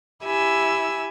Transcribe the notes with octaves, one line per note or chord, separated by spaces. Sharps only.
E4 G4 G#5 E6